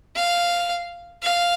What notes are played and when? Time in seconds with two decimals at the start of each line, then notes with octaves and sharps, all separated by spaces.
0.16 F5
1.23 F5